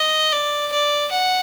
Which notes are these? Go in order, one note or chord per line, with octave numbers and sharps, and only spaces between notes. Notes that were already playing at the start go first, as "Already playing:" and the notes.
Already playing: D#5
D5
D5
F#5